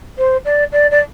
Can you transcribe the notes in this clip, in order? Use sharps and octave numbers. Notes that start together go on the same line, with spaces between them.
C5
D5
D5
D5